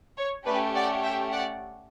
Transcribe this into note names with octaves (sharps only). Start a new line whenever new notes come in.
C#5
A3 C#4 G4 B4 D5
D5 F#5
E5 G5
D5 F#5